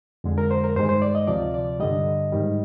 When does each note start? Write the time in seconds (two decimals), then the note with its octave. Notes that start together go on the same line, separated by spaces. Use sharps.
0.24 F2 D3 G#3
0.38 A#4
0.51 C5
0.64 A#4
0.76 G2 D#3 G#3 C5
0.89 C5
1.02 D5
1.15 D#5
1.27 D2 C3 F3 D5
1.54 D5
1.80 G2 D3 G3 D#5
2.32 G#2 D#3 G3